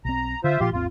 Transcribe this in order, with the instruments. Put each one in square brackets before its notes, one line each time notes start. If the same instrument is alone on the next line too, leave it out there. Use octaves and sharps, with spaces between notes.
[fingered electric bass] B1 C4 [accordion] A#5
[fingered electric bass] D3 [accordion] F4 C5 E5
[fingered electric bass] A#2 F3 [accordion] F4 G4 C6
[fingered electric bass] G#1 D#2 C4 [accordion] F4